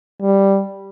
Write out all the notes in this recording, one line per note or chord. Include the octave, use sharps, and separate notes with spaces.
G3